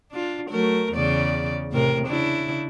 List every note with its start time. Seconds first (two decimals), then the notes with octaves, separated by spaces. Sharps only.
0.11 D4 F4
0.50 F#3 A3 A#4
0.93 E2 C#3 D5
1.72 A2 C3 A#4
2.07 C#3 D4 E4